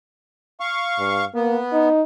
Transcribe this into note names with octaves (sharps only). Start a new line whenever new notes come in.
F5 C#6
G2
A#3 B3
D#4